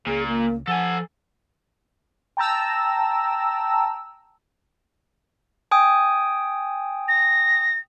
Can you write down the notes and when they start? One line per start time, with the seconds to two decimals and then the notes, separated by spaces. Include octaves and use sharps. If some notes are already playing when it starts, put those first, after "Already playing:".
0.06 C#2 A#2 G#4
0.26 A#3
0.68 F3 A4 F#5 G#5
2.37 G5 A5 A#5 E6
5.71 G5 G#5 D#6
7.08 A#6